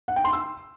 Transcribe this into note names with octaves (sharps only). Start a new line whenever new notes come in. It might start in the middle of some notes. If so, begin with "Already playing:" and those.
F#5
G5
C6
E6